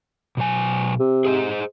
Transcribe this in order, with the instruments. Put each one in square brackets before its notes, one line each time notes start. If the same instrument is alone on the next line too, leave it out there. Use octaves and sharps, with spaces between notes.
[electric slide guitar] B2 F#3 G#5
[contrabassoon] C3
[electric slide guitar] G#4 C5 D#5